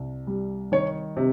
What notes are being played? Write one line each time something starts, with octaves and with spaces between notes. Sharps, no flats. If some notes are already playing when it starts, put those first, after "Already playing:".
Already playing: C2
G3
D#3 C#5
C3